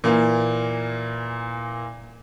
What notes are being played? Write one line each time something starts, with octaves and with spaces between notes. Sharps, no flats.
A#2 E3 A#3